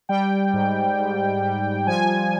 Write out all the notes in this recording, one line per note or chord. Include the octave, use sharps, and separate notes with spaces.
G3 G5
G#2
G#2
G3
F3 G#5